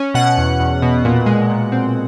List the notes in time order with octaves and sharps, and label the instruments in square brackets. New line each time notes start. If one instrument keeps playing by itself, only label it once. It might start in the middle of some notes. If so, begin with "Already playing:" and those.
Already playing: [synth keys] C#4
B2 F#5
E2
E2
B2
A#2
G#3
A#2
C4